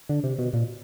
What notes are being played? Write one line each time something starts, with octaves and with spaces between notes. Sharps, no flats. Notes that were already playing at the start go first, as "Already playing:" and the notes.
D3
C3
B2
A#2